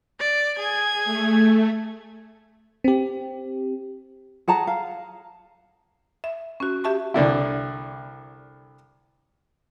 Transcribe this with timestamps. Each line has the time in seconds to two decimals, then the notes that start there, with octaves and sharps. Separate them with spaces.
0.19 D5
0.59 G#4 G#5 G#6
1.05 A3
2.84 C4 G4
4.48 G#4 F#5 A5 A#5
4.67 F5
6.24 E5
6.60 C#4 F#4
6.84 G4 E5 A5 C#6
7.14 C2 D3 D4 E4